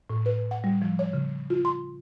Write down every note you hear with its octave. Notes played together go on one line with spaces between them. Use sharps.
A2
B4
F#5
G3
F3
C#5
C#3
F4
C6